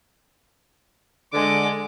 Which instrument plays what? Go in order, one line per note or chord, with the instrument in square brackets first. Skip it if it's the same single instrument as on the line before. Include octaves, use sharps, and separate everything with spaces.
[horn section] D3 [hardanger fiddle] G#3 D6